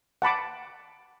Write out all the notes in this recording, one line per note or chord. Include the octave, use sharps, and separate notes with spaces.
F#5 A5 B5 D6